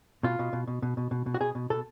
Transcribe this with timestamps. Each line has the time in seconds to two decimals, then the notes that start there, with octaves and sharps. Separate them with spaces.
0.23 B2 F4
0.39 B2
0.53 B2
0.67 B2
0.82 B2
0.97 B2
1.11 B2
1.26 B2
1.34 F#4
1.40 B2 G#4
1.55 B2
1.70 B2 A4